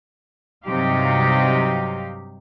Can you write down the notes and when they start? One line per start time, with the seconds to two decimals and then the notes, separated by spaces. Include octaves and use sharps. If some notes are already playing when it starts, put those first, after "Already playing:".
0.66 G2 C3 F#3 D#4 G4 F5